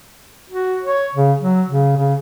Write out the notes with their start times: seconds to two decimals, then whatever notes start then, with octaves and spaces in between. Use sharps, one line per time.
0.50 F#4
0.83 C#5
1.15 C#3
1.41 F#3
1.67 C#3
1.96 C#3